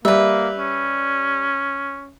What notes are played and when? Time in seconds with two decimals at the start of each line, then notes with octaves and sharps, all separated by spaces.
0.05 G3 A#3 B4 E5
0.58 C#4